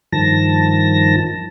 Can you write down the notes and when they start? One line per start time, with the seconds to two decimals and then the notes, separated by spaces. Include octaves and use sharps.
0.12 G2 D#3 F3 A5 A#6